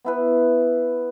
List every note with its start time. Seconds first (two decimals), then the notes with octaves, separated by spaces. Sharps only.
0.05 B3 E4 B4